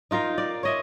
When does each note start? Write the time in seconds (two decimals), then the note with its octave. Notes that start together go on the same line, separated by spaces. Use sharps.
0.11 D#4 F4 A#4 F5
0.38 D5
0.63 C#5 D#5 E5